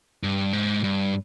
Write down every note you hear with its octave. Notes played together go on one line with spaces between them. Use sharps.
G2
G#2
G2